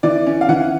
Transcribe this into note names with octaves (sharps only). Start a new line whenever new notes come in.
E3 D5
C#4
F5
E3 F#5